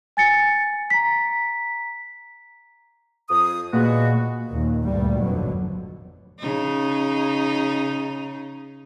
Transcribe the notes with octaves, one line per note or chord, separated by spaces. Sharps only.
G#5 A6 C#7
A#5 B6
F2 D#6
A#2 G#3 B3 F#4
D#2 A#2
D2 G2 A#2 G3
G#1 F2 B2 D3 F#3
C#3 D#4